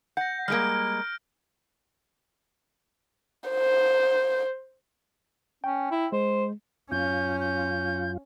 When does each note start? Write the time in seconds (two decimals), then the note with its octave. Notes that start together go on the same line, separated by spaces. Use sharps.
0.17 F#5 G6 A#6
0.48 G3 G#3 A#3 F6 D7
3.50 C5
5.64 C#4 G5
5.91 E4
6.12 G#3 C5
6.91 F#2 C#4 F4 G6
7.40 G6